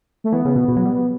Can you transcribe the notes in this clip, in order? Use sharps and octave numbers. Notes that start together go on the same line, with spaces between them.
A3
E3 B3
C#3
B2
B2
F#3
G3